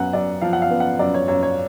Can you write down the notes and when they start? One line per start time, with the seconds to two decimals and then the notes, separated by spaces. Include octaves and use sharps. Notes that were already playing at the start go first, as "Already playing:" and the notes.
Already playing: F#2 B3 F#5 G#5
0.13 F#2 D5
0.42 F3 F5
0.53 F#5
0.62 F5
0.71 B3
0.80 F#5
0.99 F#2 D5
1.14 C#5
1.28 F#2 C#5
1.43 C#5